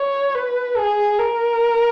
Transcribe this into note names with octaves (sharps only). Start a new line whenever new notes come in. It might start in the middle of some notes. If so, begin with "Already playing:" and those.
Already playing: C#5
B4
G#4
A#4